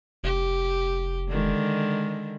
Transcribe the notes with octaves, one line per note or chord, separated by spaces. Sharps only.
F1 G4
D3 D#3 G#3